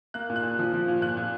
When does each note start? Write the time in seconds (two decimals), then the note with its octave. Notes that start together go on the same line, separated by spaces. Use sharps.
0.14 A#3 F#6
0.30 A#2
0.36 F#6
0.43 A#2
0.59 F3
0.73 F3
0.88 A#2
1.02 A#2 F#6
1.17 A#2